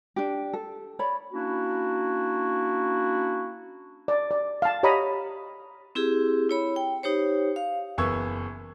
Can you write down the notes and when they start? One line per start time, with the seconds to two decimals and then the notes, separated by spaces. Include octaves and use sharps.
0.16 D4 G4
0.53 A4
0.99 C#5 D5 B5
1.32 A#3 C#4 D4 E4 F#4
4.08 D5
4.31 D5
4.62 F5 A5
4.83 G4 C#5 D#5 A#5 B5 D#6
5.95 C4 E4 G4 G#4
6.49 E4 C#5 B5
6.76 G5
7.03 D#4 G4 C5 C#5
7.56 F5
7.98 F#1 E3 B3 C#6 E6 G#6